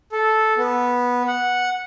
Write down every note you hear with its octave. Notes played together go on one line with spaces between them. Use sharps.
A4
B3
F#5